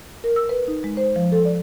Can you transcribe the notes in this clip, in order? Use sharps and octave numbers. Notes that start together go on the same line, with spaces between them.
A#4
E6
B4
D#4
G#3
C5
F3
A4
D5